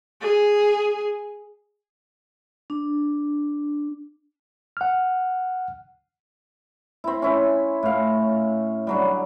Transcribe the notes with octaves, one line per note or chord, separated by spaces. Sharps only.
G#4
D4
F#5 F6
C4 E4
C#4 E4 G#5
A2 F5
D3 F#3 G3